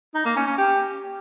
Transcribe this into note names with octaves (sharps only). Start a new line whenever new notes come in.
D#4
A#3
C#4
C#4
G4